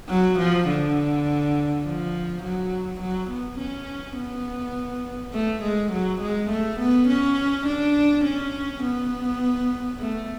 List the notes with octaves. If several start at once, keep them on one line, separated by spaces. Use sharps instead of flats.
F#3
F3
D3
F3
F#3
F#3
B3
C#4
B3
A3
G#3
F#3
G#3
A3
B3
C#4
D4
C#4
B3
A3